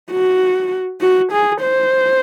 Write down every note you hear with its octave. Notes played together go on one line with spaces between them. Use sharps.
F#4
F#4
G#4
C5